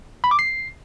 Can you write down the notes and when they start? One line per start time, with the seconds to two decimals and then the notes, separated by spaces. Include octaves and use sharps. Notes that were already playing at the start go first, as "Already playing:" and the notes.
0.24 B5
0.31 D6
0.39 C7